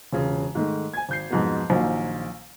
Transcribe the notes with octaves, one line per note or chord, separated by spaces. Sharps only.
E1 C#3 F4
G#2 D#3 A3
G#5 G#6
G#1 G6 C7
F2 G#2 B2
A#1 A#2 D#3 F#3